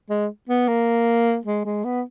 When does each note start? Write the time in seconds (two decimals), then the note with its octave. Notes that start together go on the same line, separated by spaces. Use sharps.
0.10 G#3
0.49 B3
0.68 A#3
1.45 G#3
1.65 G#3
1.84 B3